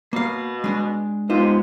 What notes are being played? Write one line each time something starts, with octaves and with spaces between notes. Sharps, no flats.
B2 A#3 F5
G#3 D4
C3 G#3 B3 D#4 F4 C5